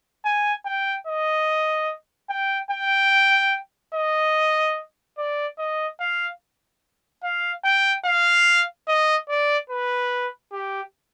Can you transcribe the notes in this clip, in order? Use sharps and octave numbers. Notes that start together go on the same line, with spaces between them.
G#5
G5
D#5
G5
G5
D#5
D5
D#5
F5
F5
G5
F5
D#5
D5
B4
G4